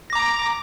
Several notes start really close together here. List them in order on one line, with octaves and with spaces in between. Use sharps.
A#6 D6 A#5